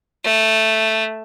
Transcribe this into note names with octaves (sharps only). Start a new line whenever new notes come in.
A3